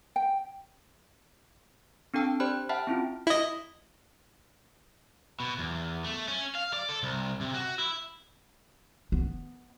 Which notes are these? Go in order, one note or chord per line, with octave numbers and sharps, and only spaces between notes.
G5
C4 D4 A4 G5 A5 E6
G4 C5 D5 B5 F#6
E5 F#5 G5 A5 B5 F6
C4 C#4 E4 F4
E4 D#5
B2
E2
A3
C#4
F5
D5
A4
C2
C3
F#4
E4
B3